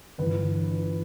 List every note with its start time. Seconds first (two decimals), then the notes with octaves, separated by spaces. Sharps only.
0.18 G1 G2 E3 B4